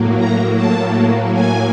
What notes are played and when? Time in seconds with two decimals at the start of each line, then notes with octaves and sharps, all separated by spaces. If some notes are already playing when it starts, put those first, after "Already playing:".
Already playing: A2 F#3 A#3
0.17 A#5
0.55 A5
1.33 G#5